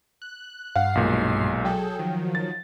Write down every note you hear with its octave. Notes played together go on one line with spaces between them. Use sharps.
F#6
G2 F5 F#5 C7
B1 A#2 G#3
F#3 G#4 A4 G5
D#3 F3 F#3
A6